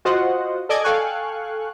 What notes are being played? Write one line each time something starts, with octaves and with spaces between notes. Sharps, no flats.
F4 F#4 C5 D#5 F#5
A4 D5 D#5 G#5 D6 G#6
A4 F5 G5 G#5 C#6 F#6